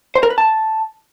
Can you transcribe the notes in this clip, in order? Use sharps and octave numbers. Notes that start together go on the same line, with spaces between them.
C5
A#4
B4
A5